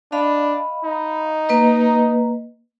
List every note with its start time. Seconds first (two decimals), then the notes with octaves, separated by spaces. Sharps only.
0.12 D4 D#5 F5 B5
0.85 D#4
1.49 A#3 B4 D#5